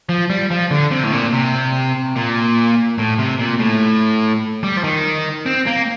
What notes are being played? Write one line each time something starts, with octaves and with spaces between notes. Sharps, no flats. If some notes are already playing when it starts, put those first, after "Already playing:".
F3
G3
F3
D3
C3
A2
A#2
C3
A#2
A2
C3
A#2
A2
G3
F3
D#3
C4
A#3